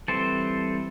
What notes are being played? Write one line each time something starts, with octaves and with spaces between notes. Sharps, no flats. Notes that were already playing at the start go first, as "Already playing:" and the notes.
E3 G3 C4 A4 C5